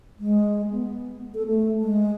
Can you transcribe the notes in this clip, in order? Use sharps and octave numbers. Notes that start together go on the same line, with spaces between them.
G#3
B3
A4
A3
G#3